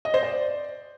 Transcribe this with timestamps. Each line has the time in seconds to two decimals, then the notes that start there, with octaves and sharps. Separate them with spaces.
0.05 D#5
0.14 C5
0.23 D5